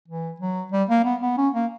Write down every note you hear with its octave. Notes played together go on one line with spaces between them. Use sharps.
E3
F#3
G3
A#3
B3
B3
C#4
A#3